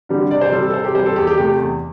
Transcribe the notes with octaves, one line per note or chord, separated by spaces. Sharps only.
D3 G3
C3 D5
C5
G3 A4
A4
C3 C5
G4
G3 C5
A4
E2 G4
G4
C3 A3 G4
E2